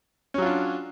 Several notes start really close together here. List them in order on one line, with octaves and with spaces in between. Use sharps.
C#4 F#3 F4 D4